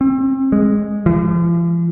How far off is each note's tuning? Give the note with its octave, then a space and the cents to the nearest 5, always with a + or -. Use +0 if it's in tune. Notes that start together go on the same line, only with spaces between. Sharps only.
C4 +35
G#3 -5
F3 -45